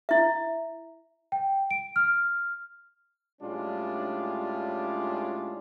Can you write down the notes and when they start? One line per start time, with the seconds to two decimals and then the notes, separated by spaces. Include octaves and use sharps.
0.09 E4 E5
1.32 G5
1.71 D7
1.96 F6
3.42 A2 G3 G#3 C#4 D4 F4